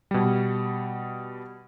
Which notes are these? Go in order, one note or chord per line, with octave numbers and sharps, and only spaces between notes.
B2 G3